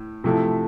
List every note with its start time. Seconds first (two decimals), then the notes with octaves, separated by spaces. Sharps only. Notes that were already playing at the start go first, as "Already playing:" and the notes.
Already playing: A2
0.24 C3 F3 A3 E4